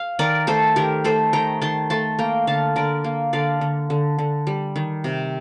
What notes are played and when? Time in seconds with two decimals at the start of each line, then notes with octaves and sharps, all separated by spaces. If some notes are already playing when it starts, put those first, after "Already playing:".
Already playing: F5
0.19 D#3 A#4 D5
0.47 A3 A4 C5
0.76 D#3 G4 A#4
1.04 A3 A4 C5
1.33 D#3 G5 A#5
1.61 D#3 A5 C6
1.90 A3 A5 C6
2.19 A#3 G5 A#5
2.47 D3 F5 A5
2.76 D3 A#4 D5
3.04 A#3
3.33 D3 D5 F5
3.61 D3
3.90 D3
4.19 D3
4.47 G3
4.76 D#3
5.04 C3